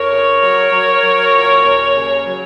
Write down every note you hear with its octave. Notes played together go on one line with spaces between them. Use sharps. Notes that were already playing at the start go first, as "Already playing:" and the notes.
Already playing: F2 A#4 C#5
C#3
F#3
F#3
F#3
A#2
D#2
C#3
F#3